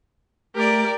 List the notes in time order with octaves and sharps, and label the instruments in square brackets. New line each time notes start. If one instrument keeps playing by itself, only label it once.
[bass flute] A3 [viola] G4 D5 [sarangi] A#4